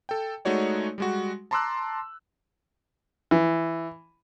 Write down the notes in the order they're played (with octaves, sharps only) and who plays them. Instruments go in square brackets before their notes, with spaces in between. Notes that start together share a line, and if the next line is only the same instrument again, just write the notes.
[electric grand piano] A4 G5
G#3 A3 D#4 F#4 C#5 D5
G3 G#3 F#4
A5 A#5 C6 D6 E6 F#6
[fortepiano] E3